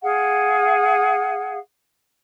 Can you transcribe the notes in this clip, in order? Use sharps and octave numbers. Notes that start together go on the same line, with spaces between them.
G#4 F5 F#5